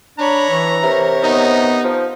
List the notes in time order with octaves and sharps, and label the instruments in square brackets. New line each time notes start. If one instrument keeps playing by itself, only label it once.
[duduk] D4 [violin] C#5 B5 [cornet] A#5
[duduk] E3
[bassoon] C3 [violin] A#4 C#5
[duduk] B3 [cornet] D#4
[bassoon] F3